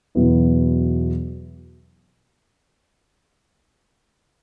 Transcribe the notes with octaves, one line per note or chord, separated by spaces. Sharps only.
E2 B2 F#3 B3 E4